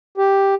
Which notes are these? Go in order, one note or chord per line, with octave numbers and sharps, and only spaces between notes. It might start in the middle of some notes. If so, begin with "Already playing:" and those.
G4